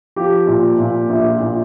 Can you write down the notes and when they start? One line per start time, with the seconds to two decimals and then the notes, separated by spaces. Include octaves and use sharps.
0.16 F3 G4
0.47 A#2
0.79 A#2
1.09 A#1
1.41 A#2